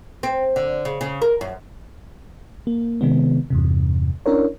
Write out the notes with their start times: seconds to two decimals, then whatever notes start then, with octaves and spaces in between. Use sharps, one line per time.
0.23 C4
0.56 D3
0.85 C#3
1.01 C#3
1.22 A#4
1.41 F#2
2.67 A#3
3.01 C3 D#3 G#3 B3
3.50 E2 G2 C3
4.26 C#4 D4 E4 A#4 C#5